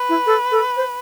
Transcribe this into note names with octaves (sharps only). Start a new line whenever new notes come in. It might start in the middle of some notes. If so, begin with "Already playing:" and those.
Already playing: B4
E4
A4
A4
C5